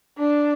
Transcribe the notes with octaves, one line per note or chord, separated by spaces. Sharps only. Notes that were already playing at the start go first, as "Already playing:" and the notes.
D4